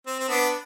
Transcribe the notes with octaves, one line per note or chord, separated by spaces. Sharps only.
C4
C4
B3 D4